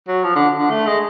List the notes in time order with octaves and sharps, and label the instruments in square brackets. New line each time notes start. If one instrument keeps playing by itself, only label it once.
[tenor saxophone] F#3
F3
D3
D3
A3
G#3